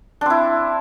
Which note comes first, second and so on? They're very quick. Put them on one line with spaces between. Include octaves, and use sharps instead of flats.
D4 C4 E4